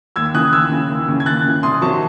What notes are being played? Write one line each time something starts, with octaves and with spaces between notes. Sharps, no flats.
D#2 E6 G#6
C#3 E3 D#6 F#6
D#2 E6 G#6
C#3 E3
D#2
C#3 E3
G#6
D#2 F#6 A6
C#3 E3
C2 C6 D#6
C3 D#3 F#3 A5 C#6